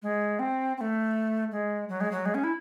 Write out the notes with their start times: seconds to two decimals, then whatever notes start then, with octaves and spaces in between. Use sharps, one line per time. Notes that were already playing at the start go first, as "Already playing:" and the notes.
0.02 G#3
0.39 C4
0.77 C4
0.81 A3
1.51 G#3
1.89 F#3
2.01 G#3
2.12 F#3
2.26 G#3
2.35 C#4
2.44 E4